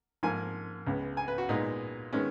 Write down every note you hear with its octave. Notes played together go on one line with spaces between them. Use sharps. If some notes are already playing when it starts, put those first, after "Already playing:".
G#2 F3 A#3 G#5
C#2 C#3 G#3 B3
G#5
B4
F#4
A#2 G#3 B3 D#4
D#3 G#3 B3 C#4